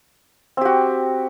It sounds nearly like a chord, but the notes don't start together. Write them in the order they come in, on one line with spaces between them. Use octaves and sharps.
C4 G4 F#4